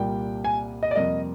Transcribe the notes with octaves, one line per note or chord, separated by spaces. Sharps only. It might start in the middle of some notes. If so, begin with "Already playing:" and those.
Already playing: C2 A#2 G3 A#3 G5
G#5
D#5
D5
F2 C3 G3 A#3 D#5